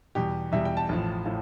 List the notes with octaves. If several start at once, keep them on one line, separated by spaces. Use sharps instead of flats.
E2 B2 G3 G4
E2 B2 G3 E5
G5
A5
A1 A2 F3
A2 F3